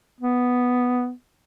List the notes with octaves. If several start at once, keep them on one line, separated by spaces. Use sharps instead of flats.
B3